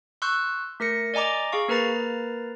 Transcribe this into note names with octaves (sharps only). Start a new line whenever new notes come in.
C6 C#6 E6 F#6 G6
A3 A#4 A#6 C#7
D5 D#5 G#5 A#5 D6
G#4 F5 C#6
A#3 A#4 B4 A#5 A6 C7